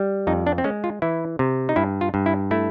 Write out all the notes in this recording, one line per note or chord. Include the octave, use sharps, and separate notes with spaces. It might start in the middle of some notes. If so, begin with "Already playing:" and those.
Already playing: G3
F2 D#4
D4
C4
G#3 C#4
F4
E3 E4
C3
D#4
G2 E4
F4
G2
E4
A3 E4